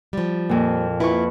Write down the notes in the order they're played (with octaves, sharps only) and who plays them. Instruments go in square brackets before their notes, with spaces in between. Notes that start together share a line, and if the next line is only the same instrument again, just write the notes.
[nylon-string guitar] F3 G3
[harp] F2 A#2
[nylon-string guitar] E4 F4 [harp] B4 C#6